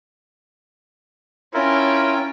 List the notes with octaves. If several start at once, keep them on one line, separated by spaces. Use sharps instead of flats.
C#4 E4 F4 A#4 G5